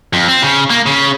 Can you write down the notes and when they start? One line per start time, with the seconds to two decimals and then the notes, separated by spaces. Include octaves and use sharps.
0.13 F2
0.28 C4
0.42 C#3
0.70 A#3
0.86 C#3